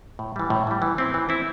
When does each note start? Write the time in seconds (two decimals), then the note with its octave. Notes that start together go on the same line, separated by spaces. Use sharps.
0.19 A2
0.36 E3 G3
0.50 A2
0.67 E3 G3
0.82 E3
0.98 C4 E4
1.14 E3
1.29 C4 E4